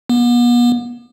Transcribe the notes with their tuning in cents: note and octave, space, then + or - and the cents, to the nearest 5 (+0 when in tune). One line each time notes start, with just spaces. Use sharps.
B3 -40